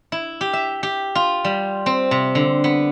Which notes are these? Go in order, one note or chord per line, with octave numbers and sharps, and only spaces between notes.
E4
G4
E5
G4
F4
G3
C4
C3
D3
B3